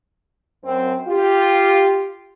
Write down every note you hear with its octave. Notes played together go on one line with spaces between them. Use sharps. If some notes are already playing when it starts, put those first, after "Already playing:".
F#2 C4
F4 G4